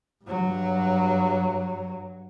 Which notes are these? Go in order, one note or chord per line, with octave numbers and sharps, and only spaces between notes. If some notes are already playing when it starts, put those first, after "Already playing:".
G2 F#3